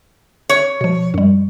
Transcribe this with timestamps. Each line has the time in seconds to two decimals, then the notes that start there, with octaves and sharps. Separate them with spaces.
0.49 C#5
0.81 B2 F3
1.14 F#2 G3